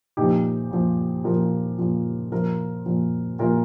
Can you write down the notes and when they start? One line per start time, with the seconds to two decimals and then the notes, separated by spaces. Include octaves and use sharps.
0.17 A#2 F3 D#4 G4
0.71 A#2 F3
1.24 A#2 F3 F4 A#4
1.79 A#2 F3
2.32 A#2 F3 F4 A#4
2.86 A#2 F3
3.39 A#2 F3 F4 A#4